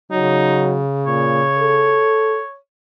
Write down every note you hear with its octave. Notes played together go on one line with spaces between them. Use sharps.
C#3 F#3 D#4
A#2 C#5
A4